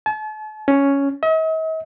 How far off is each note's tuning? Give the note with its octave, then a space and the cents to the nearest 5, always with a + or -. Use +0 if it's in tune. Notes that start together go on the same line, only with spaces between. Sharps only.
A5 -40
C#4 +5
D#5 +45